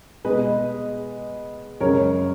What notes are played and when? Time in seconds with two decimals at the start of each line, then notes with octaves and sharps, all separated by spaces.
0.25 B2 G#3 B4 D#5
1.80 F#2 C#3 G#3 A#4 C#5